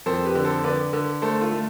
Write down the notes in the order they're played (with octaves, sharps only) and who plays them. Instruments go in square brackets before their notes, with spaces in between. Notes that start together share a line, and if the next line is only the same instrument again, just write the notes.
[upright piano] F2 A4 C5
G4 B4
D3
A4 C5
D3 B4 D5
D3
A3 A4 C5
F4 A4
A3